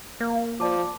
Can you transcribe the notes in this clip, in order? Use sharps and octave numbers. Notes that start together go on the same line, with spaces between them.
A#3
F3 D5 A5 D6